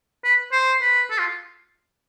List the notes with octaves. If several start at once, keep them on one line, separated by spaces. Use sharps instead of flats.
B4
C5
B4
A4
F4